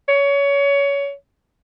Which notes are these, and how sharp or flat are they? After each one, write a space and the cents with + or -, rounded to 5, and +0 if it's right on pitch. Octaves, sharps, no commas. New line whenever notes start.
C#5 +25